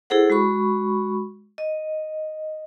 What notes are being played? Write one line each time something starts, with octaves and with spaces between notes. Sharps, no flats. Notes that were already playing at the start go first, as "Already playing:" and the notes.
E4 G#4 A4 C5 F#5
G#3 F#4 B5 C#6
D#5